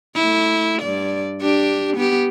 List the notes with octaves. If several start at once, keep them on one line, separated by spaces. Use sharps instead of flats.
A3 E4
G2 D5
D4 G4
B3 G4